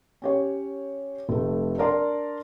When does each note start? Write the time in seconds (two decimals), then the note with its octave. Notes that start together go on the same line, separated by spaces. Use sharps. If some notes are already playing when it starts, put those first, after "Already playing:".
0.22 C#4 G4 C#5
1.29 F1 A3
1.78 D4 A#4 D5 C6